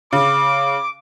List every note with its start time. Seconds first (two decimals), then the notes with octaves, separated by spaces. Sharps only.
0.13 C#3 D6